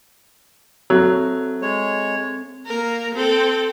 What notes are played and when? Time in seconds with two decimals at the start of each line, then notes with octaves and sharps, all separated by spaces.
0.90 F#3 C4 A4 E5
1.62 G#3 C#5
2.66 A#3 A#4
3.15 C4 A4